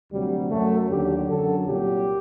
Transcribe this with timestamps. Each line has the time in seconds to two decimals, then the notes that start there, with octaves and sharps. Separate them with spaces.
0.10 D2 C3 F#3 G3
0.49 F#2 F#3 A3
0.89 D#2 D3 F#3 G4
1.27 F#2 D3 F#3 A4
1.66 C2 A#2 F#3 G4